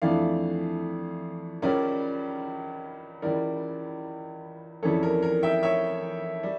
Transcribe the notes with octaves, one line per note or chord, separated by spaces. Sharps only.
F2 E3 A3 D4 D5 F5
C#2 C#3 G3 C#4 A#4 D5
C#2 C#3 E3 G3 A#4 D5
F2 C#3 E3 G3 A4 C#5
A#4
A#4
E5 G5
C#5 E5
G3